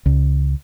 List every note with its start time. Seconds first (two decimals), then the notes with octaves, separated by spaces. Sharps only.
0.06 C#2